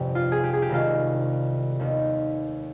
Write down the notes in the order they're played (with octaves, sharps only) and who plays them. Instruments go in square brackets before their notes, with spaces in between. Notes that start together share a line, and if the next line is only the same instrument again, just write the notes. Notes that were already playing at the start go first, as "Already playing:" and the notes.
Already playing: [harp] G1 F2 C3 C4 G4
F4
G#4
G4
G#4
G4
C2 C3 D#3 G#3 F4
D#2 D#3 B3